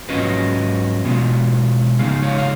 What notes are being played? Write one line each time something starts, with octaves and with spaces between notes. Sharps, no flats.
G#2 F#3 C#4 F4 B4 D#5
B2 G#3 B3 F4
C#3 G#3 D#4 F5
C#5 F5
F5